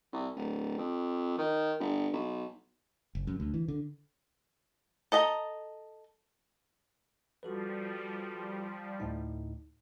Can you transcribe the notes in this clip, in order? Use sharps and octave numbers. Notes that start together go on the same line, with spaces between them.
C2
D1
F2
D#3
G1
B1
F#1
F#2
D2
E3
D3
A4 D#5 A#5
F3 G3 F#4 A4 B4
D2 A2 D#4